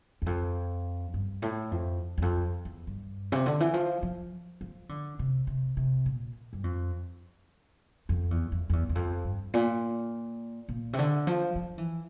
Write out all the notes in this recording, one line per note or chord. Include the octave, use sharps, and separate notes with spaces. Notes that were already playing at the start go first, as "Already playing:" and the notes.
E2
F2
G2
A2
F2
E2
F2
E2
G2
C3
D3
E3
F3
F3
F3
D3
C3
C3
C3
A#2
G2
F2
F2
E2
F2
F2
E2
E2
F2
G2
A#2
A#2
C3
D3
F3
F3
E3